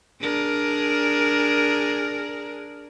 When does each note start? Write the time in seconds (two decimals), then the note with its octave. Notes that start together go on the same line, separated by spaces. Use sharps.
0.22 D4 G#4 A#4